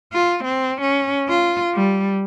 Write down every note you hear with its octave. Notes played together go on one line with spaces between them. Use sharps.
F4
C4
C#4
F4
G3